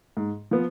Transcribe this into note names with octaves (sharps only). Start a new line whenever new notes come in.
G#2
F3 B3